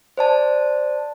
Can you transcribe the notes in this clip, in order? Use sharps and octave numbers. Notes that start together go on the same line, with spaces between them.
C5 D5 A5